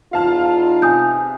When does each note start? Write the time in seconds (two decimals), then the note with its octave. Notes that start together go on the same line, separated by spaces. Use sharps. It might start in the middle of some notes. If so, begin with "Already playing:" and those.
0.13 E2 D#4 F4 F5 A5 F6
0.82 C3 G#5 D#6 G6